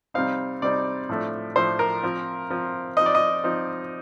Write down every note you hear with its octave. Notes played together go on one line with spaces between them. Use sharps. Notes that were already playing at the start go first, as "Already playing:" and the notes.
C3 G3 C4 D#4 F5
C3 G3 C4 D#4 D5
A2 F3 A3 D4
A2 F3 A3 D4 C5
A#4
F3 C4 F4
F3 C4 F4
F3 C4 D#4 D#5
D5
D#5
F3 C4 D#4